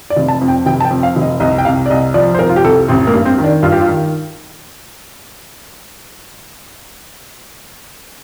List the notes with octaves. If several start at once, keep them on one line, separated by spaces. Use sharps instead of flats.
D5
F1
A5
F2
G5
F1 G5
A5
G5
F2
F5
F1
D#5
C2 D#5
G5
C2 F5
D5
C2 D#5
F3 D5
C5
C2 A#4
F4
G4
C2 A4
A1 C4
A#3
G2
C4
D#3
D4
G2 F4
G4
F4
D#3